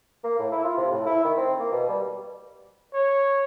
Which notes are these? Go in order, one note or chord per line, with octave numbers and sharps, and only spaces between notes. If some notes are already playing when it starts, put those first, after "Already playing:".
A#3
A2
E4
F4
C3
A2
E4
D#3
C4
A#3
B2
G3
C#5